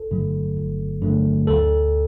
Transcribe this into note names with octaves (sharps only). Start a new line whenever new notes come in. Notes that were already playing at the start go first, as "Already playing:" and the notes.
Already playing: G1 A4
G2 D3 F#3 A3
G1
G2 D3 F#3 A3
D2 A4